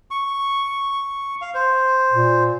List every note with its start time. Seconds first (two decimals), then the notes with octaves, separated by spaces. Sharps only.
0.11 C#6
1.41 F5
1.54 C5
2.13 A#2